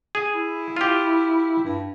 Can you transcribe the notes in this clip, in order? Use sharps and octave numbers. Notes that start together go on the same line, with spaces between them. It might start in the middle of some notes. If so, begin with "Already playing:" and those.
G#4
E4
F4 G4
G2